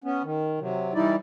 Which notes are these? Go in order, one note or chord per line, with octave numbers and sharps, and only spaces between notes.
B3 C#4
D#3
C3 F#3
E3 G3 D#4 E4 D5